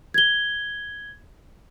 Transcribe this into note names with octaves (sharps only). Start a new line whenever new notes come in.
G#6 G7